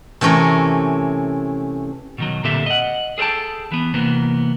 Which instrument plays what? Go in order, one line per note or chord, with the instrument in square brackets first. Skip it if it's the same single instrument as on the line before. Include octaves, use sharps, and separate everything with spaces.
[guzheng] C3 E3 A3 C#4 A#4
[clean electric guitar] B2 D#3 F#3
A#2 D3 C4 G4 A4 E5
D#5 F#5
G#4 A4 C5 G5 A5
E3 B3
C3 E3 A#3 B3